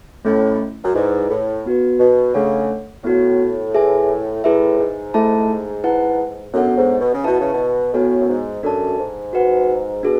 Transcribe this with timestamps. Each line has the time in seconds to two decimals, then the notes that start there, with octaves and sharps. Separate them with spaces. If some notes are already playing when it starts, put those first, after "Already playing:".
0.25 A2 A3 C#4 E4
0.84 F#2
0.94 G#2 E4 G#4 B4 D5
1.30 A2
1.66 B3 F#4 B4
2.00 B2
2.34 C#3 A3 D4 A4 C#5 F#5
3.04 A2 B3 F#4 C#5
3.75 G#4 B4 E5 G#5
4.44 A2 E4 G#4 B4 E5
4.79 G#2
5.14 A3 E4 A4 E5 A5
5.84 E4 B4 F#5 A5
6.54 F#2 B3 D4 A4 C#5 F#5
6.77 G#2
7.01 B2
7.14 C#3
7.24 B2 E4 B4 E5 A5
7.41 C#3
7.54 B2
7.94 A2 B3 F#4 C#5 G#5
8.20 F#2
8.29 G#2
8.63 F#2 D4 A4 D5 A5
8.98 G#2
9.33 F#4 B4 F#5
10.03 B2 D4 G#4